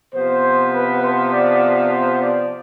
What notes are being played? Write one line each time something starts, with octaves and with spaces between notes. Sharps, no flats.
C3 F3 B3 C5
B4
C5
D5
C5
D5